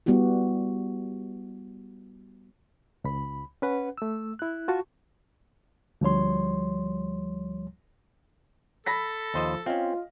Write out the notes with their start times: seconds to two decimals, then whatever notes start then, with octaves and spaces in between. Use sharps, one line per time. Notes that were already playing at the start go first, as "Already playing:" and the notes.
0.06 G3 B3 E4 F#4 G4
3.04 C#2 B5
3.62 C#4 B4 F#5
3.98 A3 E6
4.39 E4 F#6
4.68 F4 F#4 A5 C#6
6.01 D2 F3 G3 C#5 C6
8.86 A4 B5 A#6 B6
9.34 D#2 F3 C5 D#5
9.66 C4 C#4 F4 D#5 F5